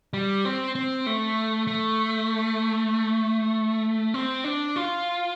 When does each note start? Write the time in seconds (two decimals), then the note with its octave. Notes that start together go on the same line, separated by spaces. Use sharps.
0.13 G3
0.45 C4
0.75 C4
1.06 A3
1.67 A3
4.14 C4
4.44 D4
4.76 F4